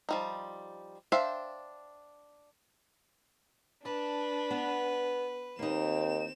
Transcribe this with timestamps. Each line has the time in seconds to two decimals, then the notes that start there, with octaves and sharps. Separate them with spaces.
0.09 F3 G3 D#4
1.12 D4 C5 E5 F5 G5
3.85 D4 B4 D5 A5
4.51 B3
5.59 D#2 A#3 C4 D#4 E7